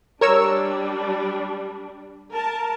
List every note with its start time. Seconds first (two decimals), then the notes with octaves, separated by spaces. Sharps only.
0.21 G3 D4 A#4 C#5 E6
2.32 A#4 A5